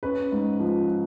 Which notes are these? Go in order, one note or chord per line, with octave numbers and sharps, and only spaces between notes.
C#4 B4
G#2
F3